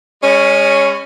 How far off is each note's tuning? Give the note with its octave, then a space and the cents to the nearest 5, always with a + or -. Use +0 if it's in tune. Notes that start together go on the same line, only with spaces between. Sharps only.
G#3 -35 C#4 +0